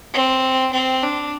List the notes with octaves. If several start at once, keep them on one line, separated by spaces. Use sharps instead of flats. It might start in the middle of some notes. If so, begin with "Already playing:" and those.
C4
C4
D4